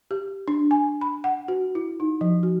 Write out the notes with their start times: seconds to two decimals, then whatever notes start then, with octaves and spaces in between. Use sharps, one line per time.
0.11 G4
0.48 D4
0.71 G#5
1.01 B5
1.24 F#5
1.48 F#4
1.75 E4
2.00 D#4
2.21 F3
2.43 F#4